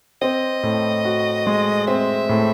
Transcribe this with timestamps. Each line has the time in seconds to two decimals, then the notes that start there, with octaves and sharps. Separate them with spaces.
0.22 C4 D#5
0.63 A2
1.05 F#4
1.47 G#3
1.87 C4 E5
2.29 A2